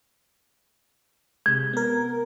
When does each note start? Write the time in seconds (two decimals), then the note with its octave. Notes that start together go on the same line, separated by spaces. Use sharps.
1.46 C3 G#3 G#6
1.73 B3 A#4